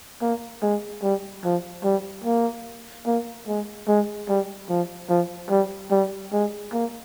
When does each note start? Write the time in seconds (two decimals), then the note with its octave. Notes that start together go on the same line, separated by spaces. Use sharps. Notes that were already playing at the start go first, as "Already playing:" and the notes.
0.22 A#3
0.62 G#3
1.02 G3
1.44 F3
1.84 G3
2.24 A#3
3.07 A#3
3.47 G#3
3.88 G#3
4.28 G3
4.69 F3
5.09 F3
5.50 G3
5.91 G3
6.32 G#3
6.73 A#3